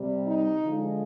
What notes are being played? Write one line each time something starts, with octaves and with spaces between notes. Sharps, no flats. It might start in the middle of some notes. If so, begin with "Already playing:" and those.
Already playing: C3 G3
D#4
D3 F3 G#3